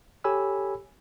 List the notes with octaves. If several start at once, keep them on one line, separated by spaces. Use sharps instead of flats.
G4 A4 C#5 G#5 B5 E6